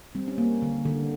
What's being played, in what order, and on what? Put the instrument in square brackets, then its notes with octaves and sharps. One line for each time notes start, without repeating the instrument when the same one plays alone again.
[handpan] G3 C4
C#4
A#3
D3
D3